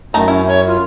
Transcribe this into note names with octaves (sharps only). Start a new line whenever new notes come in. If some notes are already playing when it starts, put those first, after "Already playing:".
F#2 D#3 A3 A5 A#5
C#4 E4
C#5
F4